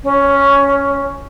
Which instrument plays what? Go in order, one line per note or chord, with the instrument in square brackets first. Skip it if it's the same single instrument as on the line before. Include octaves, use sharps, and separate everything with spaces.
[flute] C#4